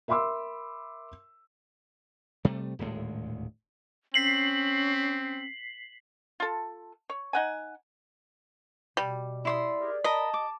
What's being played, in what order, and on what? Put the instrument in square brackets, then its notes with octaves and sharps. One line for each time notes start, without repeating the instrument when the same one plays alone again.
[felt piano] A#4 E5 B5 C6 D6 E6
[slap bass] C3 G3 A3
D#1 D2 A2 G#3
[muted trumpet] C4 [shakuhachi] C#4 [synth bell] B6 C7 F#7
[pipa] F4 A4
C#5
D#4 F#5 G#5
[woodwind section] B2 [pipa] G3
[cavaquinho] E4 C6 D#6 [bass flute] D5
[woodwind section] G4 G#4 A#4
[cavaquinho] A#4 B5 [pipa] D#5 [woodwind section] A5
[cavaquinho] D6